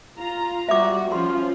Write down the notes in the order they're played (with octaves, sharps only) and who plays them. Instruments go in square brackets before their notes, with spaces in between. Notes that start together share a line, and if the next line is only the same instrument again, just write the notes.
[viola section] F4 A#5
[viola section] G3 F#4 [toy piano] E5 D6
[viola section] F3 C#4 F4 [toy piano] C6